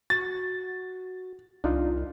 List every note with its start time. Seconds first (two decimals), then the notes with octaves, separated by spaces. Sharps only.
0.10 F#4 A6
1.64 C2 D4 D#4 F4